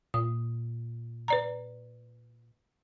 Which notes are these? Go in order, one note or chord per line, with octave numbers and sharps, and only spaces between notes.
A#2 D#6
B4 D5 A#5